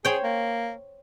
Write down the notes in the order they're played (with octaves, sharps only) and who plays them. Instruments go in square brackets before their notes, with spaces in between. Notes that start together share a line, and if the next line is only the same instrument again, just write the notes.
[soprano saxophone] G#4 [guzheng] C5 C#5 G5
[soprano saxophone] A#3